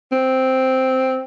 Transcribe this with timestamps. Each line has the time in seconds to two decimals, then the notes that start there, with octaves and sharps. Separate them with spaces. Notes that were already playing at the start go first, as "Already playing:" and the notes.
0.12 C4